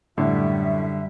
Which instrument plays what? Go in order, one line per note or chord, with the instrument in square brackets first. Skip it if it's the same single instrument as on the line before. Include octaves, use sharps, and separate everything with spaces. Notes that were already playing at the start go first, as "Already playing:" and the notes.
[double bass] F#2 G3 [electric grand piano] A2 [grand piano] D3 [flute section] E5